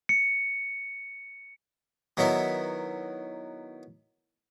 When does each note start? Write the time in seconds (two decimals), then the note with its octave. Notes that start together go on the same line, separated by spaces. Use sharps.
0.09 C#7
2.17 D#3 F#3 B3 E4